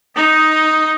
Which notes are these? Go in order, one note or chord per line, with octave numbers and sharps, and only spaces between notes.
D#4 D#5